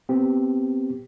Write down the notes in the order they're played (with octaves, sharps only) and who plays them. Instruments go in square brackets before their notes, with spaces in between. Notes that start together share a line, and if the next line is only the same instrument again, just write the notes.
[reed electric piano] B3 C4 G4